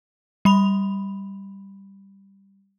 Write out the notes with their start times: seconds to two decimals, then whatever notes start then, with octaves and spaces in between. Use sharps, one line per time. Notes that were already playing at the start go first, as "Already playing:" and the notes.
0.45 G3 B5 F7